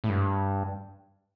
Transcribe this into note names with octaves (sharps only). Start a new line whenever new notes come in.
A2
G2